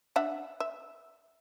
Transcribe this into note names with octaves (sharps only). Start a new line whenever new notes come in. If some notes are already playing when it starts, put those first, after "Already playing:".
D4 E5 F#5
E5